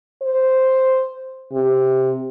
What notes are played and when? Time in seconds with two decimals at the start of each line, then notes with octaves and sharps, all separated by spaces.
0.23 C5
1.53 C3